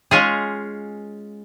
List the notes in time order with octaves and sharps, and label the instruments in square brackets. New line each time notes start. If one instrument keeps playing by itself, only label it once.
[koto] G#3 C#4 F4 G#4